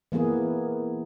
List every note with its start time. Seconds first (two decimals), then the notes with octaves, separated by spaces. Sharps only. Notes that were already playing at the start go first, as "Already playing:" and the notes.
0.12 E3 A#3 B3 G#4